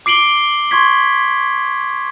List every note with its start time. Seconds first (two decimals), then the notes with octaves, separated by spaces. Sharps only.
0.06 D6 C7 D7 F#7 G7
0.71 C6 C#6 G#6 B6